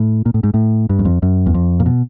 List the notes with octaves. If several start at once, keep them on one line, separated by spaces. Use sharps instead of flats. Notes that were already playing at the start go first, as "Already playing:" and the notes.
Already playing: A2
A#2
A2
G#2
A2
G2
F#2
F2
F#2
E2
F2
A#2
B2